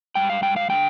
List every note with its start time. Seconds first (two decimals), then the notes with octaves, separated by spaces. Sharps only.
0.15 G#2 G3 G5
0.30 F5
0.43 G5
0.56 F5
0.70 D3 G#3 G5